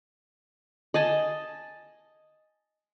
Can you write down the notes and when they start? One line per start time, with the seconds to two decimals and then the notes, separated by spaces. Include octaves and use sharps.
0.94 D#5 G#5 A5